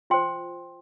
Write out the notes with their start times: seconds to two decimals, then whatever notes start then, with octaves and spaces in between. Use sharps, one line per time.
0.10 F4 C5 G5 C6